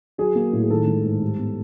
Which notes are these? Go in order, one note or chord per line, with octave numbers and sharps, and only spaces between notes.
F#3 G#4
A#3
A2
G#4
D#3 A4
G#3
G#2
G3
B3